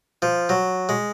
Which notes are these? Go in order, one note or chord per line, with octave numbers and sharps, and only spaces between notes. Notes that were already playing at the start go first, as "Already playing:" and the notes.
F3
F#3
G#3